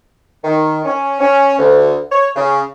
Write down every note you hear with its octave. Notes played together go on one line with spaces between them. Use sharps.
D#3
C#4
C#4
D2
C#5
C#3